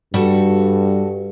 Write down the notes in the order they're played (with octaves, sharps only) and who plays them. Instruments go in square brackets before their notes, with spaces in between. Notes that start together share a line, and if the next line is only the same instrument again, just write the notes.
[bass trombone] G2 [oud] G3 [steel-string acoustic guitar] F#4 A4